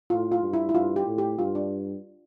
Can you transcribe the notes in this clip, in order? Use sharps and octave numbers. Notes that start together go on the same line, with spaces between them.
A2 F4
F4
G2
E4
E4
G2 F4
G4
A2
G4
G2 F4
D4